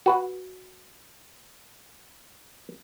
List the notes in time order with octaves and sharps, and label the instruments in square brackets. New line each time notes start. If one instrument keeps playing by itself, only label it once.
[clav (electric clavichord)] F#4 B4 F#5